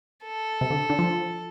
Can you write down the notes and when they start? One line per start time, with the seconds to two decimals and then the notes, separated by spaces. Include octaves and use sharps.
0.24 A4
0.61 C3
0.70 D3
0.90 D3
0.99 F3